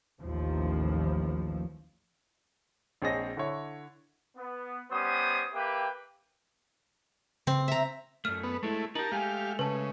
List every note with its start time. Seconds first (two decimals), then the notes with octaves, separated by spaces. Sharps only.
0.20 A1 D#2 F3
3.02 A#1 C4 G#4 C#5 D#5 A#6
3.37 D3 E4 C#5
4.37 B3
4.91 G3 B3 C#4 C5 D#6
5.54 A#3 G4 B4 E5 G5
7.47 C#3 C4
7.68 E5 A#5
8.25 F#2 A3 F6
8.44 B3
8.63 G#3 A3 E4
8.95 D#4 G4 A#4 A5 F#7
9.12 G#3 A3 G4 F5 G#5
9.59 C#3 B4 A5